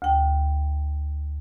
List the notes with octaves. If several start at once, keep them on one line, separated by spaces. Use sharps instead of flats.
D2 G5